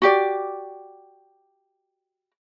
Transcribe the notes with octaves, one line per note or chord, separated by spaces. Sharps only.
F#4 G4 D5